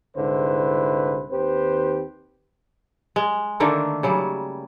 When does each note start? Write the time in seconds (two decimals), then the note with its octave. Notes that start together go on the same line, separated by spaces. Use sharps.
0.16 C2 G#2 D3 E4 B4 C5
1.31 D#2 D#3 C4 G4 B4 C5
3.16 G#3
3.60 D3 D#3 A3 A#3
4.03 C#3 F#3 G3